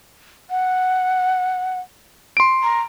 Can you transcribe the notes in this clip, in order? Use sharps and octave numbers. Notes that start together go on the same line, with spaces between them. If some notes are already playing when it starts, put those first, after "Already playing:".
F#5
C6 D7
A#5